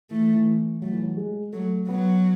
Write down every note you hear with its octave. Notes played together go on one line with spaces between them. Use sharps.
E3 A3
E3
E3
F#3 A3
E3
F#3
G#3
F#3 A3
F#3 B3